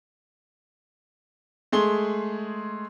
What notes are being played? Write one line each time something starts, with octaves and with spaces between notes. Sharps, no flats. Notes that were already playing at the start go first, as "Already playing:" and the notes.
G#3 A3 G#4 C6 G7